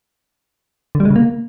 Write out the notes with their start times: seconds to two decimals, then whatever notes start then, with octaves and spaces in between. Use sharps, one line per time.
0.95 D3
1.00 G3
1.05 G#3
1.10 C#3
1.16 A#3